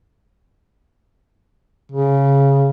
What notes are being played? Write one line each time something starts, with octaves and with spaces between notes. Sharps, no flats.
C#3